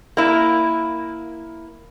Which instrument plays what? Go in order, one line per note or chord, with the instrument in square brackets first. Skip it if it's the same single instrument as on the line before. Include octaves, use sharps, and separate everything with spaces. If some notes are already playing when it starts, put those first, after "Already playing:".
[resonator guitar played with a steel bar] A#3 E4